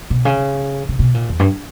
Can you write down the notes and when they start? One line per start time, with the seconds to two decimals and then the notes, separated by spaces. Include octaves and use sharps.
0.10 B2
0.25 C#3
0.89 C#3
0.99 B2
1.14 A#2
1.29 E2
1.39 G2